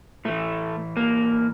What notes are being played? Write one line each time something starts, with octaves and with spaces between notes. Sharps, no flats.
A2 E3 A3
A#3